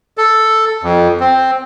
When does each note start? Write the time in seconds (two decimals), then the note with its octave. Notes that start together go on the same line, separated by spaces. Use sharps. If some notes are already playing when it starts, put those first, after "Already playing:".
0.18 A4
0.83 F2
1.20 C4